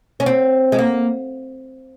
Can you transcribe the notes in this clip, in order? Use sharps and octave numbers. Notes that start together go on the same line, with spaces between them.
C#4
C4
G#3
A#3